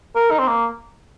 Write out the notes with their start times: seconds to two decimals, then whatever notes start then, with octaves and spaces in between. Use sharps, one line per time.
0.16 A#4
0.31 D#4
0.39 C4
0.47 A#3